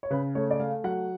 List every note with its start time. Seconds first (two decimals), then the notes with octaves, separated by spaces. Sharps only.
0.03 C#5
0.10 C#3 B4
0.35 A3 C#5
0.50 D5
0.60 A3 F5
0.84 F#3 F#5